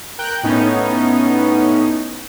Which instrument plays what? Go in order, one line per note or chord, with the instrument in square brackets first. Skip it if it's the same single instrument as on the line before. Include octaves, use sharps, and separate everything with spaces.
[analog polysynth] A#4 G5 F#6 G6
A2 B3 C#4 D#4